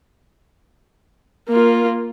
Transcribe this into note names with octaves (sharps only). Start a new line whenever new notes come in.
A#3 F4